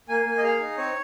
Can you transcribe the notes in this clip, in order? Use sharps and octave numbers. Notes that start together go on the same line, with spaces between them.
A#3 G#5
A#3
D#5
G#4 F5
D#4
C4 C#5